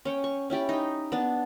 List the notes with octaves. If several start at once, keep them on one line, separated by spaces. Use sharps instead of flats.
C#4 C#5 G5
C#6
C#4 E4 G4 D5
D#4 G5
B3 D4